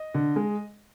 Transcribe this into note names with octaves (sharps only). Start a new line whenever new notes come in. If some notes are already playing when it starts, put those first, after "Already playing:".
Already playing: D#5
D3
G#3